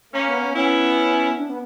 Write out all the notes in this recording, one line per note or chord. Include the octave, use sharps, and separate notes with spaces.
A#3 C#4
B3
B3
B3 C#4 E4
D4
B3